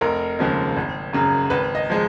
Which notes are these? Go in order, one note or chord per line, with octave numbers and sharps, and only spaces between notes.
F1 A#4
D#2 C#3 F3 G#3
G#1
F#2 C#3 F#3
G#1 B4
D#5
F3 G#3